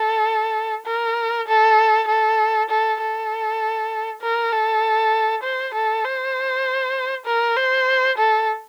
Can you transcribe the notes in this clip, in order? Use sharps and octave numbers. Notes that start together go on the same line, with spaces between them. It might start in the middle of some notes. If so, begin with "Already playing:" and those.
Already playing: A4
A#4
A4
A4
A4
A4
A#4
A4
C5
A4
C5
A#4
C5
A4